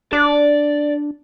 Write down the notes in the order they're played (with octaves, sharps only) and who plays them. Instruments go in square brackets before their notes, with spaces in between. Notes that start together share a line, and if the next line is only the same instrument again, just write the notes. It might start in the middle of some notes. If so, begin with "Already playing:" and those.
[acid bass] D4 [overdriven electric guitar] D5